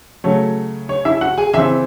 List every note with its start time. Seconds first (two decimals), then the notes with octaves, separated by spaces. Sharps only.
0.24 C#3 F#3 A3 C#5
0.89 C#5
1.05 E4 E5
1.21 F#4 F#5
1.38 G#4 G#5
1.53 C#3 E3 C4 E5 E6